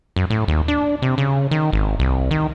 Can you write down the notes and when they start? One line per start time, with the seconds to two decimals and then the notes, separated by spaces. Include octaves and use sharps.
0.16 F#2
0.30 A2
0.48 D#2
0.68 D4
1.02 C3
1.18 C#3
1.51 D#3
1.72 G#1
1.99 C2
2.31 D#3